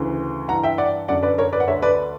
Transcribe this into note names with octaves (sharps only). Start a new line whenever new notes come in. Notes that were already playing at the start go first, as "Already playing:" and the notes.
Already playing: D2 C#3 E3
G2 E3 F#5 A#5
E5 G5
D5 F#5
F#2 D3 D5 F#5
B4 D5
A#4 C#5
B4 D5
F#5
D2 D3 C#5 E5
B4 D5